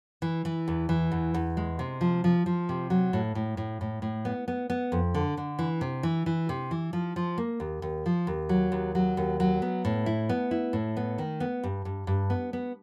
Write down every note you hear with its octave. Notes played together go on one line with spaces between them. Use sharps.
E3
E3
E2
E3
E2
E2
G#3
C3
F3
F3
F3
C3
F#3
A2
A2
A2
A2
A2
B3
B3
B3
F2
D3
D3
E3
C3
E3
E3
C3
E3
F3
F3
A#3
D#2
D#2
F3
D#2
F#3
D#2
F#3
D#2
F#3
B3
A2
E4
B3
E4
A2
B3
D#3
B3
G2
G2
G2
B3
B3